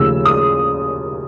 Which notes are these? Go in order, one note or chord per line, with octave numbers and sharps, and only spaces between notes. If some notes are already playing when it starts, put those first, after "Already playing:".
Already playing: D#2 C#3 F3 A3 E6
D#6